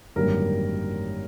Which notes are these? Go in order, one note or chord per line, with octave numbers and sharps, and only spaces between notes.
G#1 F#2 D3 G3 A#3 A#4